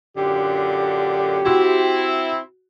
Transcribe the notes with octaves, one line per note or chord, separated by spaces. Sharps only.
F#2 A#2 D3 G4
C4 E4 F#4